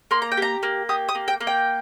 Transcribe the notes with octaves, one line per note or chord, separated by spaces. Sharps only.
A#3 C6
A#5
G5
G4 A#5
A#3
G4 D#6
D#6
A#3
G5
A#3
G5